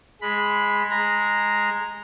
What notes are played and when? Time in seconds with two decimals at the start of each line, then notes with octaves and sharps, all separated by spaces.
0.21 G#3 B5
0.90 G#3 A#5